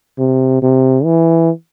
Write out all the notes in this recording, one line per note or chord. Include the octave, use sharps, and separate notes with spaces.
C3
C3
E3